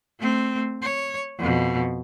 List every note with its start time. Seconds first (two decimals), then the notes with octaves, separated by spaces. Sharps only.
0.19 A3 C4
0.82 C#5
1.39 F2 B2